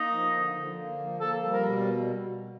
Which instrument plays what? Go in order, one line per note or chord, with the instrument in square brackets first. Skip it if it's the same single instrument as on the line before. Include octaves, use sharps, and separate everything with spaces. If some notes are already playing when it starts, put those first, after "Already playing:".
Already playing: [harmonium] A#3 [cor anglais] D#4
[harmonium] F3
D3
D3
A#3
F3
[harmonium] A#3 [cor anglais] A4
[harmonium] G3
[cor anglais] A#4
[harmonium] B2